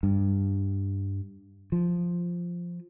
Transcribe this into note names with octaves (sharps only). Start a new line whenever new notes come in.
G2
F3